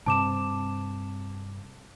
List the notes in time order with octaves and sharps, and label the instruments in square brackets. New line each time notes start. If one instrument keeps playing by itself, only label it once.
[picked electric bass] G2 C3 C4 [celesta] A5 D6 E7